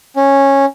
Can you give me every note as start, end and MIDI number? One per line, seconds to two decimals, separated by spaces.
0.16 0.65 61